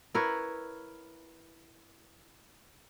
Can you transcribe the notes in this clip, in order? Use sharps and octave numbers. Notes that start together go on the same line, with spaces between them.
E4 A#4 B4 C#5